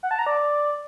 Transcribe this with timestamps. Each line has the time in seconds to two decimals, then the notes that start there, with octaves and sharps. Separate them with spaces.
0.03 F#5
0.11 A5
0.19 A#5
0.26 D5